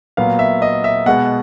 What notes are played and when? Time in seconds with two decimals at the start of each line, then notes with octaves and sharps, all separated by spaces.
0.17 A#2 F#3 B3 F5
0.39 E5
0.62 D#5
0.84 E5
1.06 B2 G#3 B3 F#5